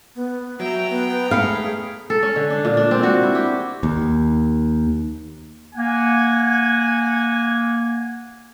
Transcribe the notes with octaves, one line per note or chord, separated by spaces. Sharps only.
B3
F#3 E5 G5 A#5
B3
A3 G#4 F5 B5 C#7
A4
C#4
D3
D4
A#2
D4
C4
F#4
E4
G4
D#2
A#3 F#5 G#5